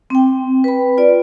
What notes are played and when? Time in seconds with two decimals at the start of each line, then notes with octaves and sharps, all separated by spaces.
0.10 C4 G5
0.64 B4 B5
0.97 F4 D5